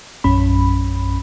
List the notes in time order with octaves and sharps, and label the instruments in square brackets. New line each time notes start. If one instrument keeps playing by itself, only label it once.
[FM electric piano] A#1 F#2 C#4 B5